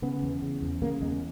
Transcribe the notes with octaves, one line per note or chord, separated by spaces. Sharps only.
C#3 B3
E2
C#3
E2
C#3 A#3
E2 G#3